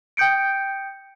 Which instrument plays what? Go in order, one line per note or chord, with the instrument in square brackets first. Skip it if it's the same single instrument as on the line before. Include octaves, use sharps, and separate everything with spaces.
[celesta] G5 D#6 G6 C#7 D7